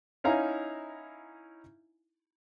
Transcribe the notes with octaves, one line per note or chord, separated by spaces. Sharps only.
C#4 D#4 E4 F5 G#5 A#5